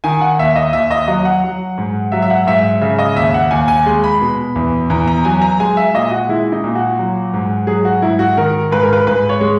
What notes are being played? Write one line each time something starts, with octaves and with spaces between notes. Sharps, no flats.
D#3 G#5
F#5
D#2 E5
D#5
D#2 E5
D#5
F#3 D#5
F#5
F#3
G#2
F#3 E5
E5
F#5
G#2 E5
C#3 E5
D#5
D#2 E5
F#5
D#2 G#5
G#5
G#3
B5
B2
E2
E2 A#5
A#5
F#3 G#5
A#5
G#3 G#5
E5
A#2 D#5
F#4
G#3 E4
D#4
A#2
F#4
F#3
G#2
F#3 G#4
F#4
G#2 E4
F#4
D#3 A#4
G#2 B4
A#4
B4
G#2 B4
C#5
G#3